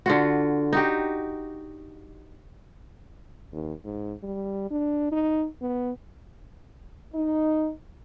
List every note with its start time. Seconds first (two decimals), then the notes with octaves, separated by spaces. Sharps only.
0.06 D3 F4 F#4
0.73 D#4 F#4 G4
3.52 D#2
3.85 G#2
4.23 G3
4.70 D4
5.12 D#4
5.61 B3
7.14 D#4